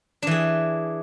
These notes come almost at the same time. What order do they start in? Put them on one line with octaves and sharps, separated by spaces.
D4 E3 G#4